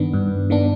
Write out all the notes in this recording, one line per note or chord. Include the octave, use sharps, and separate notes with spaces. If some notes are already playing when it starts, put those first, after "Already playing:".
Already playing: G2 D#3 B3 D4
G2
D#3 B3 D4